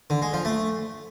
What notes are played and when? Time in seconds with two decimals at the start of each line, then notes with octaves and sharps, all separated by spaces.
0.10 D3
0.22 G#3
0.33 F3
0.45 A3